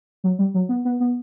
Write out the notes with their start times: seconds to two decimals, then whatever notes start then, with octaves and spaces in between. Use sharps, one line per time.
0.24 F#3
0.39 G3
0.54 F#3
0.69 B3
0.85 B3
1.00 B3